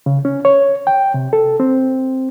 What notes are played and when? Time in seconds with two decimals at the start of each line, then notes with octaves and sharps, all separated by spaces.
0.06 C#3
0.25 C#4
0.45 C#5
0.87 G5
1.14 C3
1.33 A4
1.60 C4